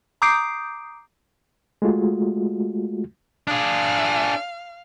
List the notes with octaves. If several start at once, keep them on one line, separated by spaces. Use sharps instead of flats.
A#5 D6 D#6 G6 C7 D7
G#3 A3 F4 F#4
D4 G#4 F5